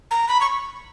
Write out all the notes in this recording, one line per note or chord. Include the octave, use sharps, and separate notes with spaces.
A#5
B5
C#6